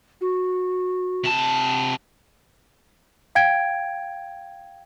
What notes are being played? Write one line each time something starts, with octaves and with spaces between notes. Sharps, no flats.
F#4
C3 A5
F5 G5 G#6 D7